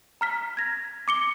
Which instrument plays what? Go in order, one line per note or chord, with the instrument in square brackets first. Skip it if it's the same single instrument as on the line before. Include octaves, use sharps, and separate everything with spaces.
[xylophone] A#5 F6 B6
G#6 A#6
D6 C#7 G7